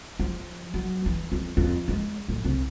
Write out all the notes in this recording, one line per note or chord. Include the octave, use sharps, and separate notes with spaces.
F3
F#3
E3
F2
F2
G#3
A2
C2